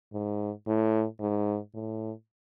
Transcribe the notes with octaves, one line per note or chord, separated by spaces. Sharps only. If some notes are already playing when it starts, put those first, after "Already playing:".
G#2
A2
G#2
A2